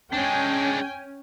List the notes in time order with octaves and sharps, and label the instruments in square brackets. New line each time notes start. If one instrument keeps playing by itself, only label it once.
[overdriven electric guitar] G#3 D4 [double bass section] C#4 [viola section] G5 G#5